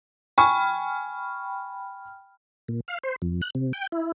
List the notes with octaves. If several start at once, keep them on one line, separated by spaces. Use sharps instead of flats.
G5 G#5 B5 C#6 F6
A#2
F5
C5
F2
F#6
C3
G5
E4